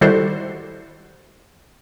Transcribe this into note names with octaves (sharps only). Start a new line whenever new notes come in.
D#3 G3 E4 F#4 A4 C5